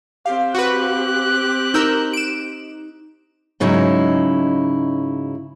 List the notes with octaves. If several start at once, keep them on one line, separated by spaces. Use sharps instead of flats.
C4 G4 F5
F#4 B4 F#6
D#4 A#4 E6 G6
D7 E7
G#2 C#3 F#3 D#4 E4